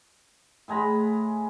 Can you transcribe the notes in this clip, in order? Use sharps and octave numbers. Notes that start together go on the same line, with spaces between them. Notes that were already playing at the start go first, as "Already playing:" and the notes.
A2 G#3 A#5 B5